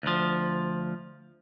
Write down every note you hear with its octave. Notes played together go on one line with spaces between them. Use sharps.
D2 F3